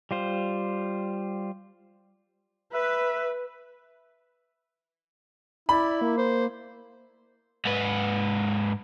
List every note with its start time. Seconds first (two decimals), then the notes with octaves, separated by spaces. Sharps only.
0.11 G3 F4 C5
2.74 B4 E5
5.69 E4 D5 B5
6.01 A#3
6.18 C5
7.65 G#2 B4